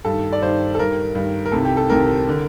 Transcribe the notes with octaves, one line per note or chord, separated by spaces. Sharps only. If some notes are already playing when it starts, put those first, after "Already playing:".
G2 D#3 A4
D5
G2 D#3 C5
A4
G2 D#3 A#4
G2 D#3
A#4
C2 C3 D#3 A4
G4
A4
C2 C3 D#3 A#4
D3